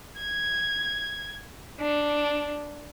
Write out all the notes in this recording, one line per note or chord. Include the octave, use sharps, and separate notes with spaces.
G#6
D4